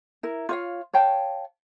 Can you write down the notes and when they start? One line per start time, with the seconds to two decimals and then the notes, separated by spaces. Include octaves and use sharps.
0.23 E4 A#4
0.49 F4 C#5 F5
0.93 C#5 F5 G5 A5